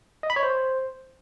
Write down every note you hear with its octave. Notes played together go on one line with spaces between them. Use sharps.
D#5
B5
C#5
C5